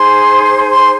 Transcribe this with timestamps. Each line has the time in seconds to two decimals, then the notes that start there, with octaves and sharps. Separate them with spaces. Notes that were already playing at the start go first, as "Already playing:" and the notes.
Already playing: D#4 G#4 C5 C6
0.69 C6